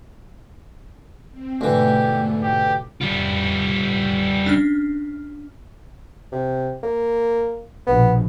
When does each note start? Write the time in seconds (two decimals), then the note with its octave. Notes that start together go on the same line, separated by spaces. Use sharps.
1.32 C4
1.61 D2 G#2 B2 E3 A3 G4
2.43 G4
3.01 G3 F4
4.46 C#4 D4 F6
6.32 C3
6.83 A#3
7.87 A#1 B2 B3